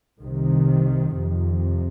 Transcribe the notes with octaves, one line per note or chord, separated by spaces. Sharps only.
C2 C3 D#3
F2 C3